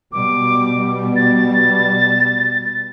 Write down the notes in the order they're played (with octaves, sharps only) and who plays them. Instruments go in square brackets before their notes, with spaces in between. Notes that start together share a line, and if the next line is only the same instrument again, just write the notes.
[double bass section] B2 G3 [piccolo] D6
[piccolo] A6